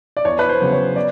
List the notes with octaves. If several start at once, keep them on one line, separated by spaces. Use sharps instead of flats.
D5
E2 C#5
B4
C5
C#3 F#3 B3
C#5
D5